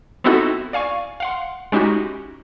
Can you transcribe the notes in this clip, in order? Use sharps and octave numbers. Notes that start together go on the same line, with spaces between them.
B3 C4 D#4 E4 F#4 A4
D5 F5 G#5 C#6
F5 F#5 C6
G#3 C#4 D#4 E4 F#4 G4